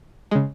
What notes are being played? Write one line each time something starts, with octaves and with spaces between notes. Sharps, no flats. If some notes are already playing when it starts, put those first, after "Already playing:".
C#3 G#3